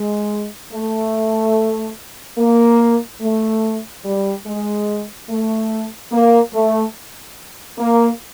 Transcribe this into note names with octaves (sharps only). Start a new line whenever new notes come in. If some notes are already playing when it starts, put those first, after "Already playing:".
Already playing: G#3
A3
A#3
A3
G3
G#3
A3
A#3
A3
A#3